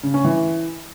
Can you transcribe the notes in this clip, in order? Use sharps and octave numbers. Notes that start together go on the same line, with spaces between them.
C#3
C#4
E3